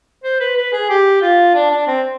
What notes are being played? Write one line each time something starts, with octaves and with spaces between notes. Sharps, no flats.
C5
B4
B4
G#4
G4
F4
D4
D4
C4